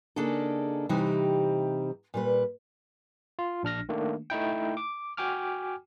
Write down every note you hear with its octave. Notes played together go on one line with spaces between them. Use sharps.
C#3 A#3 D4 D#4 G#4 A4
C3 E3 G3 C4 D#4 G4
A#2 G3 B4
F4
A#1 D4 F6 A#6
D#3 A3 A#3 D4
A3 D#4 E4 G5
D6
F#4 G5 G#5 D6 F6